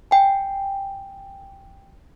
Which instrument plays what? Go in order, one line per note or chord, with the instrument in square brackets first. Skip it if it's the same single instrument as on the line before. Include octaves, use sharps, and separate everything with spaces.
[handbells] G5 G#5